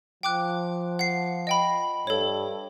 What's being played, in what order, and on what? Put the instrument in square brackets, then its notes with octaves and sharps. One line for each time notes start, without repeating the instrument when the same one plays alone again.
[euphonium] F3 [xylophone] G5 D6 F#6
[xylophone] F#5 C7
D#5 G5 B5
[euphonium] G2 [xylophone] A4 C#5